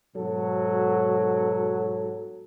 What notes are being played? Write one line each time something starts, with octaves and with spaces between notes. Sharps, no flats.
G#2 B2 F#3 A4